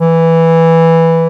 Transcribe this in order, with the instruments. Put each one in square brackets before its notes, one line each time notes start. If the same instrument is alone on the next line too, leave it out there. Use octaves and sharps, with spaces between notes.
[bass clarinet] E3